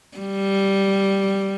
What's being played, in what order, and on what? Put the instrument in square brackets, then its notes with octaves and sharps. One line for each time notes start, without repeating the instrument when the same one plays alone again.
[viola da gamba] G3